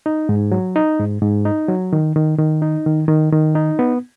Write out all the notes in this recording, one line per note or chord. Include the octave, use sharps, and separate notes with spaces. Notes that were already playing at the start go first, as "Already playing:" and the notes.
D#4
G#2
F#3
D#4
G#2
G#2
D#4
F#3
D#3
D#3
D#3
D#4
D#3
D#3
D#3
D#4
B3